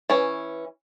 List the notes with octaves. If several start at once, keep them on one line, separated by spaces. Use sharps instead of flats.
E3 C#4